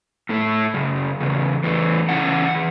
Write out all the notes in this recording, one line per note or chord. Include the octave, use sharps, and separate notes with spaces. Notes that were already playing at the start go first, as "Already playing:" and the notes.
A2 A3 E4
F#2 C#3
E2 C#3
E2 E3 A3
C#3 E3 C#4 E4 F#5
E3